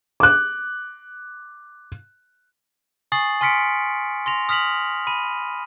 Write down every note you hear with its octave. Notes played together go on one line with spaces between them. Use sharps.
D6 F#6
G#5 C#6 D#6 A6 C7 F#7
G#5 C6 F6 B6 C#7 D7
C6 A#6 F7
D#6 F6 B6 F7 F#7
B5 D#7